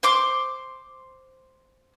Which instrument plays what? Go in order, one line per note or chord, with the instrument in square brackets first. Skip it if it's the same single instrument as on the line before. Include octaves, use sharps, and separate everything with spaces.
[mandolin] C5 C6 D6